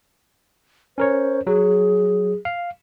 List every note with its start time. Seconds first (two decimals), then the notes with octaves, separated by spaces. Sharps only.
0.98 C#4 A#4 C5 C#5
1.47 F#3 G#4
2.45 F5